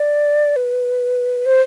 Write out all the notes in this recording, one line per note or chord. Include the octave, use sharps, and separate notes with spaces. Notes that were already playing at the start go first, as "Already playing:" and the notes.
Already playing: D5
B4
C5